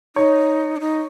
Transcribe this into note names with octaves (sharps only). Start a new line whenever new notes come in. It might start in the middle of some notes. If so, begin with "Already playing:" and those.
D#4 C#5
D4
D#4